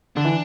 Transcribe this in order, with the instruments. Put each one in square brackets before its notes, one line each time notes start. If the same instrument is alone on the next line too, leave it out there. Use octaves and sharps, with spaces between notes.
[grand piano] D3 [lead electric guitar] D4
[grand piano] E3